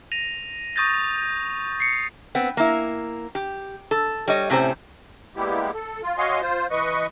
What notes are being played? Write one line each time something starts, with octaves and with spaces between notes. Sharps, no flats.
A#6 D#7 F7
C#6 D#6 G6 A6 A#6
C7 C#7
B3 C4
A#3 E4
G4
A4
G3 C#5 D#5
A2 C3 C#4 D#4 C5
G3 G#3 A#3 B3 E4 G4
A4
F4
F#4 C#5 D#5 F5 G#5 C6
F4 C5
E3 B4 D#5 C#6